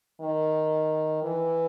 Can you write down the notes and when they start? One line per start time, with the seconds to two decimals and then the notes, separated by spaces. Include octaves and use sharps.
0.21 D#3
1.23 E3